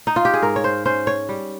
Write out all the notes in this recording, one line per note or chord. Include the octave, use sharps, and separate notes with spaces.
D#4
F4
G4
G#4
G#2 A#4
C#5
C5
C#4 C5
C#5
G3